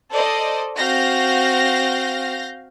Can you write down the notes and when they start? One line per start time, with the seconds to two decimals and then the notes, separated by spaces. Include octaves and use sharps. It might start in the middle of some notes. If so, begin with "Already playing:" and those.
0.11 A4 C5 D5 D#5
0.76 C4 F#4 F5 G6 A#6